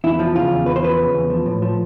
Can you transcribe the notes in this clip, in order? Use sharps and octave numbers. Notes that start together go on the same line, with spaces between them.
E2 E4
F3
C#3 F4
E2
E2 B4
C5
F3 B4
C#3
E2
F3
A2
F3